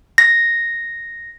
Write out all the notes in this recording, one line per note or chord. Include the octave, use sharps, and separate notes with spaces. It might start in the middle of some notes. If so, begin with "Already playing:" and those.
A#6